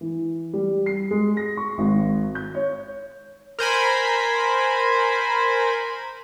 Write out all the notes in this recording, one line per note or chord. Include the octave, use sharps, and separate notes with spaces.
E3
G3
C7
G#3
A#6
C#6
G#1
G6
C#5
A#4 C5 G#5 B5